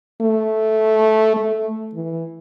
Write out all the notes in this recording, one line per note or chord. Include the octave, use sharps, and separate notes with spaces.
A3
A3
E3